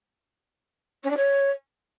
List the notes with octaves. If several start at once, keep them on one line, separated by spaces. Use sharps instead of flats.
C#4
D4
C#5